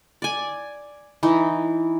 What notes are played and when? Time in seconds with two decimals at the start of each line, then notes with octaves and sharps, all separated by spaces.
0.22 D5 G#5
1.23 E3 D#4